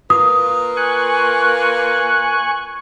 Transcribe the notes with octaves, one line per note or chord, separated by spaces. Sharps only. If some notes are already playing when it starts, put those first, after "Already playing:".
A#3 F4 B4 D#6
G#5 C#6 F#6